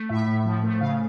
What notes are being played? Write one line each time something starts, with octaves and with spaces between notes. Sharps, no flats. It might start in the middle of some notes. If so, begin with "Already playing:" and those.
Already playing: A3
A2 E5
A2
F3
A3
C#3 F5